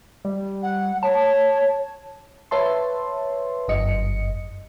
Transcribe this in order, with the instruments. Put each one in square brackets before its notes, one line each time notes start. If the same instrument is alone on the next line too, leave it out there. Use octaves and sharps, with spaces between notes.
[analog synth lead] G3
[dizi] F#5
[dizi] C#5 [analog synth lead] A5
[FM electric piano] B4 C#5 E5 A5 C6
G1 F#2 D#5 C#7